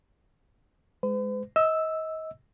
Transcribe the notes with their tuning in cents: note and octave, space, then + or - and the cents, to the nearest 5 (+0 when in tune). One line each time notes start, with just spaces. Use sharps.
G#3 +0 B4 +45
D#5 +35 E6 +0